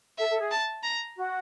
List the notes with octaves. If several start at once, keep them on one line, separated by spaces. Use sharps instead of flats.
A4 E5
A4
G#4
A5
A#5
F#4